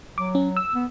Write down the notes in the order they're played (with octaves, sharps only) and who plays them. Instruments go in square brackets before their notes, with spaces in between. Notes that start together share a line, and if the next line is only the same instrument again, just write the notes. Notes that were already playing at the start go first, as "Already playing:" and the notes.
[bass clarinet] F#3 [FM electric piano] D6
[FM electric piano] C#4
E6
[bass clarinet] B3